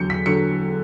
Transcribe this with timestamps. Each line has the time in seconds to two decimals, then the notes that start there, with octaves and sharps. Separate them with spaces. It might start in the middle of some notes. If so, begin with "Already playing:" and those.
Already playing: E2 D3 F#3 G6 C#7
0.10 B6
0.26 D3 F#3 C#7